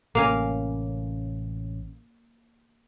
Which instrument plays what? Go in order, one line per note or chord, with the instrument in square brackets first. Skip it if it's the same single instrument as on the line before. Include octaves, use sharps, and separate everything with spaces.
[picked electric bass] A1 C3 C#4 [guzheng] A#3 F5 G#5